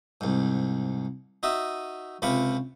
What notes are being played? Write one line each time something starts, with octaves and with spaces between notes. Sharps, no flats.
C2 G#2
D#4 F#4 E5 D#6
C#2 C3 F4 B5 C#6 D6